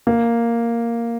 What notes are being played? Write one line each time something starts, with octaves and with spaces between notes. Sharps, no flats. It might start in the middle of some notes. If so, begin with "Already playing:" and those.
A#3